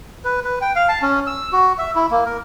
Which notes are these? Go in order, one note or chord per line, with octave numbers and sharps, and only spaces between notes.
B4
B4
G5
F5
A5
C#4
E6
F#4
E5
E4
A#3
A#4